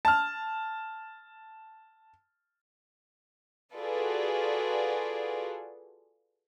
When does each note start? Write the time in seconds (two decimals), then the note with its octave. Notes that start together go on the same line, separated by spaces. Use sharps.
0.05 A5 F6
3.75 F4 F#4 G#4 A4 B4 D5